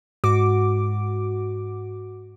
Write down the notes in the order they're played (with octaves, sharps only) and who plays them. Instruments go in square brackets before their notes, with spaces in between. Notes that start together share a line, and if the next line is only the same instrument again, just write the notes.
[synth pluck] G#2 F#4 D6